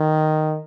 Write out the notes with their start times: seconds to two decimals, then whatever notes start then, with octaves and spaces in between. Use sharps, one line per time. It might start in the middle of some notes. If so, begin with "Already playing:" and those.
Already playing: D#3